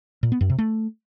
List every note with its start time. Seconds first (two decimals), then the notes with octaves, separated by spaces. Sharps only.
0.23 A#2
0.32 B3
0.41 F#2
0.50 C3
0.59 A3